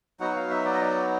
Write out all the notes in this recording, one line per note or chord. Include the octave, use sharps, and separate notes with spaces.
F#3 B3 D#4 F#4 F#5
F5
E5
D5
D#5
D5